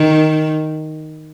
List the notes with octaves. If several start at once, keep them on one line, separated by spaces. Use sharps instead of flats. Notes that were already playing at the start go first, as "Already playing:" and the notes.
Already playing: D#3